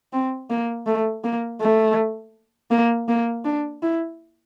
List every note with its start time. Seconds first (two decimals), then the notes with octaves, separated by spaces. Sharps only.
0.13 C4
0.50 A#3
0.86 A3
1.24 A#3
1.61 A3
2.71 A#3
3.08 A#3
3.45 D4
3.82 E4